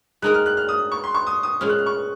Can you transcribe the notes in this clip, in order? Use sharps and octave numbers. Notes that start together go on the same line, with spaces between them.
G#3 D#4 A#4 D#5 F#6
F6
F#6
F6
D#6
C#6
C6
C#6
D#6
D#6
A#2 G#3 C#4 F6
F#6
F6
C#6